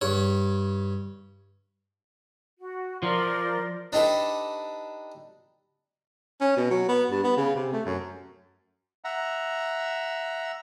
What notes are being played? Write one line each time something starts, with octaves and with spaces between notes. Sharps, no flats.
G2 C#5
F#4
F3 A#4 D5 C6
D4 D#4 G4 A4 B4
C#4
B2
F#3
B3
G2
B3
C#3
C3
A3
F#2
E5 F#5 A#5